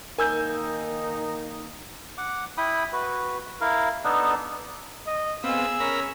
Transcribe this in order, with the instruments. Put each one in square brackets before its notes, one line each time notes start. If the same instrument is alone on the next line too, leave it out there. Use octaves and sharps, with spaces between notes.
[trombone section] D#3 A#3 D#4 [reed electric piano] A#4 [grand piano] G#5 E6 G6
[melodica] F#5 D6
E4 G5 B5 D#6
F#4 B4
E4 A#4 F5
B3 D4 D#4 A4
[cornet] D#5
[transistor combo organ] B3 C4 [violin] G#4 E6 [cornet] F5
[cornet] C#4 [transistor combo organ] A#4 B5